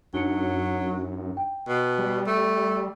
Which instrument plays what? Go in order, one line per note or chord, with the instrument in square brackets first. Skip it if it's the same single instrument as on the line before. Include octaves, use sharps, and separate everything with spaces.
[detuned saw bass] F#2 [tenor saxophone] F#3 [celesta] D4 D#4 C#7
[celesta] G5
[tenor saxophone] B2
[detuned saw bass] G3
[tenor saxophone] A3